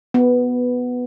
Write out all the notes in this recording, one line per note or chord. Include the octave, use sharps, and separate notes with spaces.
B3